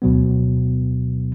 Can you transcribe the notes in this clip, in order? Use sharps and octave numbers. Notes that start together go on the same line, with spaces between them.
D2 B2 F#3 B3